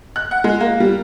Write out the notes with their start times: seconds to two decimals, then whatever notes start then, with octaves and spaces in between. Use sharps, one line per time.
0.16 F#6
0.31 F#5
0.44 G#3
0.60 A#3
0.80 G3